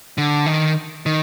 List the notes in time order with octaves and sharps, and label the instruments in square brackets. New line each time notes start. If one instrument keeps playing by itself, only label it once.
[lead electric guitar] D3
D#3
D#3